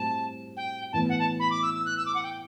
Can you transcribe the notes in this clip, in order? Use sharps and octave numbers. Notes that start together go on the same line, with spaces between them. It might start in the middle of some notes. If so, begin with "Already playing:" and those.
Already playing: A2 G3 C4 F#4 A5
G5
A2 E3 B3 A5
F#5
A5
B5
D6
E6
E6
F#6
E6
D6
F#5
G5